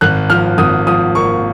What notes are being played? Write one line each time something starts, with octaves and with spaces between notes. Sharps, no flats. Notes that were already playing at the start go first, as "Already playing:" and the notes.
G#1 F#6
F3 F6
G#1 D#6
F3 D#6
A#3 C#6